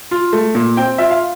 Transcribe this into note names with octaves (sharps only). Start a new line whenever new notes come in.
F4
A3
A#2
C4 G5
F4 E5
F5